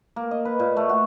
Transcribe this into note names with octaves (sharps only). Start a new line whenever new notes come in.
A#3
D#5
B4
A#2
A3
F#4